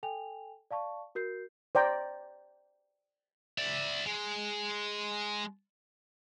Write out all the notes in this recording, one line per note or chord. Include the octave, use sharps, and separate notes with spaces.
A4 G5 G#5 F7
D5 F5 A5 C#6
F#4 A#4 G6 C7
C5 D5 G5 A#5
D5 E5
G#3